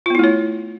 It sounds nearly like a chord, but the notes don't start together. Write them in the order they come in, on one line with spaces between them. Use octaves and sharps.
F4 B3 E4 A3 C#5